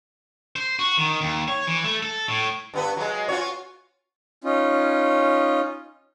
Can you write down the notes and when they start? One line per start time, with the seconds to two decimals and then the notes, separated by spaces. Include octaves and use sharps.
0.56 C5
0.79 F#4
0.98 D#3
1.21 D#2
1.48 C#5
1.67 E3
1.84 A3
2.03 A4
2.28 A2
2.74 G2 B3 B4
2.97 F#3 G#3
3.28 F4 F#4 C#5
4.44 C#4 D#4 F4